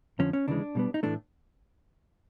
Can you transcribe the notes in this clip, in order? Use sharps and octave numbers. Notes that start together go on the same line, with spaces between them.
F2 D3 F3 C#4
C#4
D2 C#3 E3 G#3 D4
B2 G3 B3
D#4
A2 E3 A3 D4